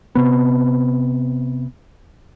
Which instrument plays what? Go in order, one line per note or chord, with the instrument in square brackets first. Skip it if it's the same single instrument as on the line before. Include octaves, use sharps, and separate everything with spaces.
[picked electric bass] C3 B3